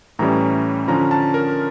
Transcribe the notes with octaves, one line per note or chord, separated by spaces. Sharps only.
A2 E3 G3 C#4 A#5
D3 F3 C#4 A#5
A5
A#4